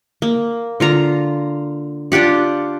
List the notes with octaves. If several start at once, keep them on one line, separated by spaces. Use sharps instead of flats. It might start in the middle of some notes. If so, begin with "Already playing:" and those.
A#3
D3 F4 A#5
D4 F4 G4 F#5